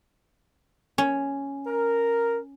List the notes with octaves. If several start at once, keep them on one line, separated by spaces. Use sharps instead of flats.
C#4
A#4